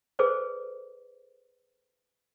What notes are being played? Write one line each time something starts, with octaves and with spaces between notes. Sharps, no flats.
G#4 A4 B4 C5 D5